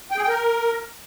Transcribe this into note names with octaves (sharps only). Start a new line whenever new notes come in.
G5
G#4
G5
A#4